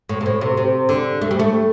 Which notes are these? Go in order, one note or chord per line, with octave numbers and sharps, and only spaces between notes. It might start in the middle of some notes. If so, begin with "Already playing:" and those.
A2
C3
A2
C3
C3
D3
A3
G3
A3